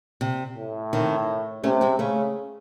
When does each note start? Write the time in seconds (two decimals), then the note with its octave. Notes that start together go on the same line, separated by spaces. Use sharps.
0.21 C3
0.56 A2
0.93 C3 D#3
1.64 C3 A3 C#4
1.81 G#3 C4
1.99 C#3 A3 C#4